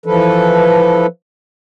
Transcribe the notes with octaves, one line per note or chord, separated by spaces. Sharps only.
E3 F3 A4 B4